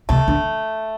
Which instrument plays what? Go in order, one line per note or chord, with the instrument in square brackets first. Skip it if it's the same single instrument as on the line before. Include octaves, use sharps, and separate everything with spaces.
[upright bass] C3 [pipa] A3
[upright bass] D3